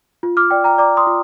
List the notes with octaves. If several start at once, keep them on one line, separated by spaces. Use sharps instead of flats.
F4
D6 F6
D5 G5
G5 A#5
D5 A#5 D6
C6 D#6
F4